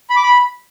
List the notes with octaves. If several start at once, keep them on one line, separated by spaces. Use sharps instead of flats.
B5
D6
B5